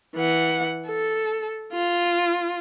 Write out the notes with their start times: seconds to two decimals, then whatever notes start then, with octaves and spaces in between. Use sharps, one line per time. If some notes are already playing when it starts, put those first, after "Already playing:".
0.15 E3 F#5
0.87 A4
1.73 F4